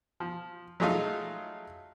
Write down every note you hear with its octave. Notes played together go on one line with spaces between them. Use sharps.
F3
F#3 G#3 A3 D#4 F4